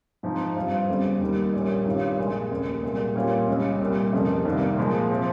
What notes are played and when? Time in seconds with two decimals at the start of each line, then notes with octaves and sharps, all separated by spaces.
0.23 G#2 F3 C4 D#4
0.56 G2 G3 C4 F4
0.89 G1 F2 C#3 G3
1.21 D#2 D#3 G3
1.54 A#1 A#2 G3 C#4
1.85 G2 D#3 G3 C#4 F4
2.18 A#1 A#2 G#3
2.51 F1 D#2 C#3
2.83 C2 A#2 G#3
3.15 A#2 G3 C#4 F4
3.48 C#2 C#3 G3 C#4
3.81 C2 A#2 G3
4.12 F1 F2 C#3 F3 A#3
4.45 C2 C3 D#3 A#3
4.77 A#2 F3 G#3
5.10 C3 F3 C4